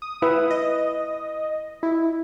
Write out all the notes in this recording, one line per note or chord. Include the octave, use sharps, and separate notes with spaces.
D#6
E4 B4 E5
D#5
E4